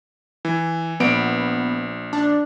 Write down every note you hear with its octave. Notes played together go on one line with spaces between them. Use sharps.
E3
A#1 B3 D7
D4